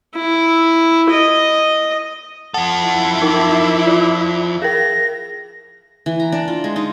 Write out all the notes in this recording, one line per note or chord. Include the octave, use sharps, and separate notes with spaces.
E4
D#5
F3 A4 F#5
E4
D#4 A#4 D6
F4
G#4 A#4 A#6
E3
A#5
D4
F4
G#3
D#4